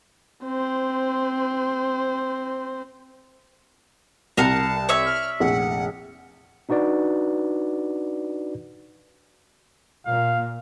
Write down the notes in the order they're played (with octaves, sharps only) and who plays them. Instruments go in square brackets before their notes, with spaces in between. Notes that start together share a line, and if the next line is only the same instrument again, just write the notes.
[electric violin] C4 C5
[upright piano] C2 [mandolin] A#4 F5 F#5 [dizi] A5
[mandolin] C#5 D5 E5
[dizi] F6
[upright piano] F1 A#1 [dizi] F#5
[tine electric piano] D4 D#4 F#4 B4 D5
[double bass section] A#2 [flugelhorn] F5